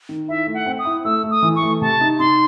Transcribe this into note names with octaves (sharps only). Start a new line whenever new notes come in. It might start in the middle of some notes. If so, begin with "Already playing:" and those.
D#3
E4 E5
A3
F#5
C4
D#6
E4
A3 E6
A3
D#6
E3
C#6
A3
C3 A5
D#4
D#4 C6